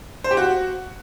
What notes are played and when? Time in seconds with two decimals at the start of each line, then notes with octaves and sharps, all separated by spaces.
0.24 C5
0.31 G4
0.37 F#4